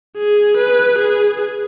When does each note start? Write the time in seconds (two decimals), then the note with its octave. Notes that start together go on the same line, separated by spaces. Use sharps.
0.17 G#4
0.58 B4
0.99 G#4